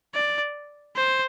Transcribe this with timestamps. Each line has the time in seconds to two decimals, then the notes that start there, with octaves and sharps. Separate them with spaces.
0.14 D5
0.96 C5